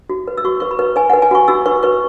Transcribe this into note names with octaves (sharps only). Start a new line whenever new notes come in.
F#4
B4
E6
F#4 C#6
B4 C#6
B5
B4
B4 G#5
F#5
B4
G#5
F#4 C#6
F#4 E6
B4 C#6
B4 C#6